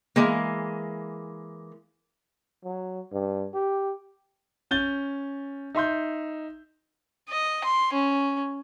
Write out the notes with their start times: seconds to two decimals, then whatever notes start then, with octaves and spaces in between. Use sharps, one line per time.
0.16 E3 G#3 A#3
2.65 F#3
3.12 G2
3.54 G4
4.71 C#4 G6 A6 G7
5.75 D#4 E5 C6 G6
7.29 D#5
7.64 C6
7.93 C#4